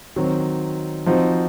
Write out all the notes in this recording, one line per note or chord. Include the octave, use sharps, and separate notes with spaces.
D#3 F#3 C4
F3 C4 D#4 F#4